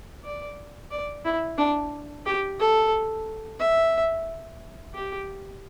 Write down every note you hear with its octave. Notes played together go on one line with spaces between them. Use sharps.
D5
D5
E4
D4
G4
A4
E5
G4